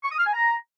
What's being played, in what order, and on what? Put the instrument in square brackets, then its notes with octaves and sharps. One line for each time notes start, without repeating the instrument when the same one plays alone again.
[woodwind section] C#6
D#6
F6
G#5
A#5